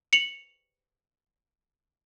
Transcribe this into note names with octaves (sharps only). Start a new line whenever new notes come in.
C#7 F7 F#7